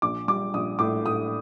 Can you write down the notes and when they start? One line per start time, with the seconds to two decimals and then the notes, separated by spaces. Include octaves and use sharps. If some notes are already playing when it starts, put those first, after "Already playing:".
0.02 A#1 D6
0.28 G3 D6
0.54 A#1 D#6
0.79 A2 D6
1.06 A2 D#6